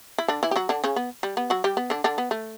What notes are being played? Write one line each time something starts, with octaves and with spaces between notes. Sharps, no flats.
E4
D3 D4
E3 E4
G4
F#3 F#4
D3 D4
C#3 C#4
B3
G3
B3
F#3 F#4
G3 G4
B3
D3 D4
D3 D4
B3
A3